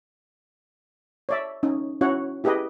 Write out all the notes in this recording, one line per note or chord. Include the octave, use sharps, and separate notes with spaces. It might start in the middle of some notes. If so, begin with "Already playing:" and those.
C#5 D5 E5
C#4 D#4
C#4 E4 F#4 C#5 F#5
E4 G4 G#4 B4 D#5